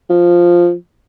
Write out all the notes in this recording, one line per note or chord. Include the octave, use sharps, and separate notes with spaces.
F3